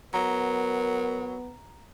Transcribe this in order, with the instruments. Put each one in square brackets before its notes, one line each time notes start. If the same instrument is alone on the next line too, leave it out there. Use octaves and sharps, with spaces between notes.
[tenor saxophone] F#3 [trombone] B3 [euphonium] A#4 [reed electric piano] A#5